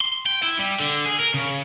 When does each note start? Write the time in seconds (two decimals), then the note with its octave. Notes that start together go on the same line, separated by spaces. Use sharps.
0.01 C6
0.26 G5
0.43 E4
0.59 G3
0.80 D3
1.06 G#4
1.20 A#4
1.34 C#3